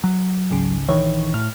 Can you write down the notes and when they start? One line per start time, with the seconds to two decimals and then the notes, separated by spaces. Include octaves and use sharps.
0.04 F#3
0.51 G#1 C#2 C#3
0.89 A#1 D#3 E3 C#5
1.34 A2 F6